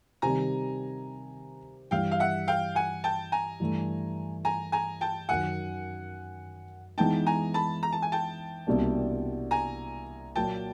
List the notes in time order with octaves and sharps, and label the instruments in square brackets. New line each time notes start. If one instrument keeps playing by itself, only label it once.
[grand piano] C3 D#3 G3 [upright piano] G#5 A#5
[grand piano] G2 E3 G3 [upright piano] F5 G5
[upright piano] F5
E5 F#5
F5 G5
F#5 G#5
G5 A5
G#5 A#5
[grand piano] G2 E3 A3
[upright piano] G#5 A#5
G#5 A#5
G5 A5
[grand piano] F#2 D#3 F#3 [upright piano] F#5 G#5
[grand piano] E3 G#3 B3 D#4 [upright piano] G5 A5
[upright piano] G#5 A#5
A5 B5
A#5
A5
G#5
G5 A5
[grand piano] C2 B2 G3 A#3 D4
[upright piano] G#5 A#5
[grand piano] A#2 F#3 A#3 [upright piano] G5 A5